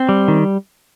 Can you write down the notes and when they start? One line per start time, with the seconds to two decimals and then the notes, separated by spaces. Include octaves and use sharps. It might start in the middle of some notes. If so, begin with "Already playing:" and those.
Already playing: C4
0.09 G3
0.28 D#3